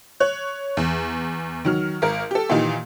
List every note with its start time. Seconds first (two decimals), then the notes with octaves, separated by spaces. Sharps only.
0.20 C#5 F#6
0.77 E2
1.65 D#3 F#3 F6
2.02 G#1 A#4
2.31 G4 A4
2.50 A#2 D#3 E3 D#4 G4